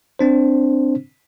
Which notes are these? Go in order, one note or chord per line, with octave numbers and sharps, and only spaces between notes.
C4 D4 C5